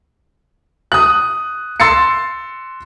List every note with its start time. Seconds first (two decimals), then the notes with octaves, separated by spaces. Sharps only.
0.92 D#6 F#6
1.80 C6 E6 A6 C7 C#7